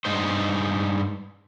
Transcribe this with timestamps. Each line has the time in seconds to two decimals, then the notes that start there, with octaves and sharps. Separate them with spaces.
0.05 G2 G#3 D#4 C5